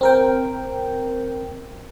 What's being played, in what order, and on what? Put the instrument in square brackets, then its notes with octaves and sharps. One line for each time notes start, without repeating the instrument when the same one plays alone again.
[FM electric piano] C4 A#4 G5